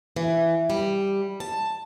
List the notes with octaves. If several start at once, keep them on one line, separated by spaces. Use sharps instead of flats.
E3
G3
A5